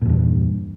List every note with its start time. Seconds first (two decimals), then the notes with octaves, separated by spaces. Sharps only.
0.02 A#2
0.05 E2
0.09 G2